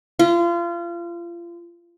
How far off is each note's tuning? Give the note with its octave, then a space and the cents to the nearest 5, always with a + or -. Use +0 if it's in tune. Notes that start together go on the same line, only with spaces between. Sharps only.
F4 -30